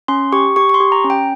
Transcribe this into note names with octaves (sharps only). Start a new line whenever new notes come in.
C#4 C6
G4 C#6
G4 C#6
C#6
C6
G4
A#5
C#4
G5